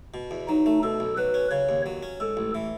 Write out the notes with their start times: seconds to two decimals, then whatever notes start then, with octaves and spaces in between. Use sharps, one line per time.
0.14 B2
0.31 E2
0.48 F#3 D#4
0.66 A3
0.83 B2 A4
1.00 B1
1.17 F#3 B4
1.34 C#4
1.51 C#3 C#5
1.69 D#2
1.86 F#3
2.03 C#4
2.20 G#2 A4
2.37 A1
2.55 E3